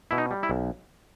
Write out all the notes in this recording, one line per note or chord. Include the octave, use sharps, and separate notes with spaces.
B2 E4
D#4
G3
E4
B1